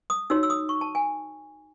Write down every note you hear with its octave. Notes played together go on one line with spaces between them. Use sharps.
D#6
D#4 F#4 C#5 E6
E6
D#6
C#6
A5
G#5